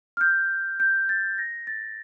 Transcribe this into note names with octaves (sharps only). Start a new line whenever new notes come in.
F6
G6
G6
A6
A#6
A6